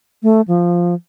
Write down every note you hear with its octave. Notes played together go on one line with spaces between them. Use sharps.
A3
F3